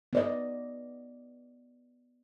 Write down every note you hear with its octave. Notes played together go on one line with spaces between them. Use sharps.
B3 D5 D#5